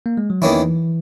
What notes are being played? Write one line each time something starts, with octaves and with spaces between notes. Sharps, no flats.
A#3
G#3
F#3
E2 D#3 E3 A#3 C#4 E4